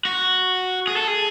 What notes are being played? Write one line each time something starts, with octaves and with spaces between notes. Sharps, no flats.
F#4
G#4
A4
G#4